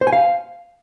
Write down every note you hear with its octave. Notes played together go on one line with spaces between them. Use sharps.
C5
G#5
F5